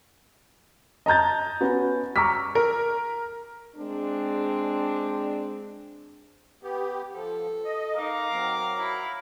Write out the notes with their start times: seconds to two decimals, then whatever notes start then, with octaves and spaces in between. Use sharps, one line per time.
1.06 D#5 A5 A#5 G6 A6
1.61 B3 C#4 F#4
2.16 A#5 C#6 D6 E6 F6 B6
2.55 A#4
3.77 G#3 C4 D4
6.63 B3 G4
7.14 F3 A4
7.65 D#5
7.97 D#4 A#4 F5 D6
8.32 F#3 C4
8.78 E4